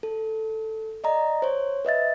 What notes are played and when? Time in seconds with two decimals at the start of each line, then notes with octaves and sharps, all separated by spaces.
0.03 A4
1.04 D5 D#5 A#5
1.42 C5 C#5
1.85 B4 D#5 E5 A6